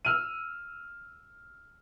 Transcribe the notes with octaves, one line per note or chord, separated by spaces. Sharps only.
E6 F6 D#7